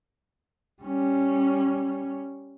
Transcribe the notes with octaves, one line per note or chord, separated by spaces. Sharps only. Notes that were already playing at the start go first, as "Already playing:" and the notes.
G3 C#4